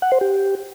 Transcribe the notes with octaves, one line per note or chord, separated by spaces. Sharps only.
F#5
C5
G4